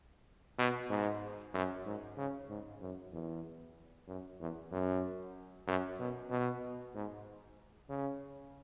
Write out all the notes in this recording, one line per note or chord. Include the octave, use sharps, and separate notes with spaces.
B2
G#2
F#2
G#2
C#3
G#2
F#2
E2
F#2
E2
F#2
F#2
B2
B2
G#2
C#3